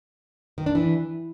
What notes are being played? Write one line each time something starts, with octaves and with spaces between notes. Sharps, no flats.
D#3
D4
E3